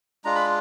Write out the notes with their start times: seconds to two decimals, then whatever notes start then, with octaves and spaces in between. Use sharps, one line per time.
0.25 G#3 D4 F4 A#5
0.35 B5